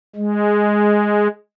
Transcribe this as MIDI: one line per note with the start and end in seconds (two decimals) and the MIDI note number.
0.16 1.28 56